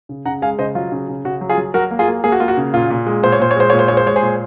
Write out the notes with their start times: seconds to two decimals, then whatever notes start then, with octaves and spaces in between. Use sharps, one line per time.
0.09 C#3
0.25 C#3 F#5 A#5
0.42 G#3 F5 G#5
0.59 C#3 C5 D#5
0.75 F#3 F4
0.92 C#3
1.08 C#3
1.25 C#3 F#4
1.41 F#3
1.49 F4 G#4
1.58 F#3
1.74 F#3 F#4 A#4
1.91 A#3
1.99 F4 G#4
2.08 A#3
2.24 A#3 G#4
2.32 F#4
2.40 A#3 F4
2.48 F#4
2.57 C#3
2.74 A#2 F4
2.90 A#2
3.06 G#3
3.23 A#2 C5
3.32 C#5
3.39 A#2 C5
3.51 C#5
3.56 G#3 C5
3.70 A#2 C#5
3.79 C5
3.88 G#3 C#5
3.97 C5
4.06 G#3 C#5
4.16 G#4 C5
4.22 A#2